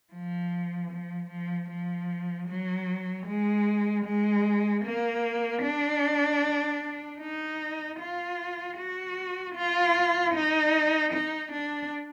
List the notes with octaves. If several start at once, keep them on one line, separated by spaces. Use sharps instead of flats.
F3
F3
F3
F3
F#3
G#3
G#3
A#3
D4
D#4
F4
F#4
F4
D#4
D#4
D4